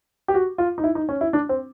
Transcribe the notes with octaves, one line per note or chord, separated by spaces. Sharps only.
G4
F#4
F4
D#4
E4
D#4
C#4
E4
D4
C4